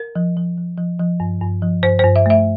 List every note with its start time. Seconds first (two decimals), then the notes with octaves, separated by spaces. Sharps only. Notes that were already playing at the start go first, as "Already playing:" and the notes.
Already playing: A#4
0.16 F3
0.37 F3
0.58 F3
0.78 F3
1.00 F3
1.20 G2
1.42 G2
1.62 F3
1.83 G2 C5
1.99 G2 C5
2.16 E5
2.26 A3 E5